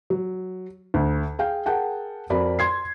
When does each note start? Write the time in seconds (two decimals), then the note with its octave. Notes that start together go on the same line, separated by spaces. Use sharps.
0.10 F#3
0.94 D2
1.39 G#4 F5 G5
1.66 G#4 A#4 F#5 G5 A5
2.30 F2 F#4 A#4 D5 B5
2.59 C6 G#6 C7